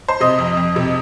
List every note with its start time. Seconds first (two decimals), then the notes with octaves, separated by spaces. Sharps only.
0.09 C5
0.20 C3 D#5
0.39 F2
0.57 F2
0.76 C3